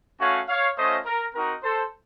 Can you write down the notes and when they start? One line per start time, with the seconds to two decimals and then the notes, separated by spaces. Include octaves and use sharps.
0.20 A3 C#4 F#4 C#5 F5
0.49 C#5 F5
0.77 A3 C#4 F4 C5 D#5
1.05 A#4
1.35 C4 D#4 F#4 A#4
1.63 A4 C5